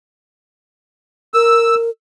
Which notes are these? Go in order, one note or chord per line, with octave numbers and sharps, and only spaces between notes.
A#4 E6